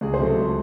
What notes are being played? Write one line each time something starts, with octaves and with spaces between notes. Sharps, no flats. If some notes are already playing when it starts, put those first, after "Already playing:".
C#2 G#4
C5
C3 F#3 A3
A4
C#2